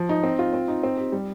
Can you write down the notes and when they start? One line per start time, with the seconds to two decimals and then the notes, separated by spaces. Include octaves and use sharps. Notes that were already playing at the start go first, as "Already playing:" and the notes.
Already playing: F3
0.09 D#4
0.23 C4
0.39 F4
0.53 C4
0.68 D#4
0.83 C4
0.97 G4
1.12 G3